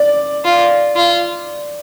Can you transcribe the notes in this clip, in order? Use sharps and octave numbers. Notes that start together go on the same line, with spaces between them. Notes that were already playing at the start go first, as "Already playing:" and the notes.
Already playing: D5
F4
F4